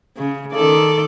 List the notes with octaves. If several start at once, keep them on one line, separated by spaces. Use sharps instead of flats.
C#3
D#3 A4 D5